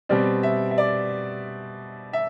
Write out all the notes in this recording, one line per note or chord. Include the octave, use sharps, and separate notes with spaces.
B2 G3 C4 D5
E5
E5
D5
E5